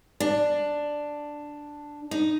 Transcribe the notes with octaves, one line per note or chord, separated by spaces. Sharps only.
D4
D#4